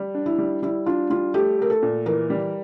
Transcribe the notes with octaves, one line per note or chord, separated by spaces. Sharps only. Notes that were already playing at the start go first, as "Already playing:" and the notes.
Already playing: G3
D4
E4
G3
G3 E4
D4 F4
G3 F4
A3 G4
A3 A#4
A4
A#2
E3 A#4
G3